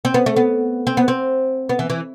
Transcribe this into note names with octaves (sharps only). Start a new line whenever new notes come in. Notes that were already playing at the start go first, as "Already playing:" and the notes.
C4
B3
A3
B3
C4
B3
C4
B3
E3
E3